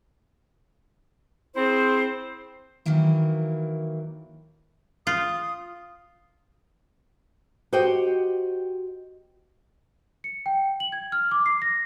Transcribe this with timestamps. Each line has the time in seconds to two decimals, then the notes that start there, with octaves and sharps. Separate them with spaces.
1.55 C4 E4 G#4 C5
2.86 D#3 E3 F#3 A#3 E4
5.07 F4 D#6
7.73 F#4 G4 C5 D#5 F#5 G5
10.24 C#7
10.46 G5
10.80 F#7
10.92 G#6
11.12 F6
11.31 D6
11.46 C7
11.62 A#6